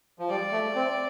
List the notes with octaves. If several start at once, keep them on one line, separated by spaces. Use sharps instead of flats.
F3
G3 D5
A3
C4